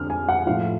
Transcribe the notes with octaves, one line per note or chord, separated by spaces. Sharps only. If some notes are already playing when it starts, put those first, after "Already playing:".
Already playing: F2 D3 F3 F6
G#5
F#5
A2 F3 F5